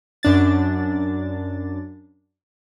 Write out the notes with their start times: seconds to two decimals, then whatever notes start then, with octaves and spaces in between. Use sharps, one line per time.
0.23 F#2 D4 A6